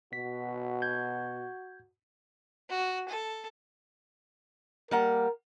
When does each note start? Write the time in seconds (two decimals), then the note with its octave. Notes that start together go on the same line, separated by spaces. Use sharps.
0.13 B2 F#4 B6
0.82 G6 G#6
2.70 F#4
3.09 A4
4.91 G3 A#3 A#4 F#5